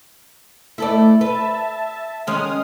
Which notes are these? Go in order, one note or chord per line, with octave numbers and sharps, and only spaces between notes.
A3 E4 A4 D5
B4 E5 A5
D#3 G#3 C#4 D#6 F6